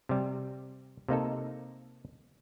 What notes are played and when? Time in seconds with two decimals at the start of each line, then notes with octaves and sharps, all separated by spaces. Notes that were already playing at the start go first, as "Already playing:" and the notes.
0.09 C3 G3
1.08 C3 A#3 D#4 A4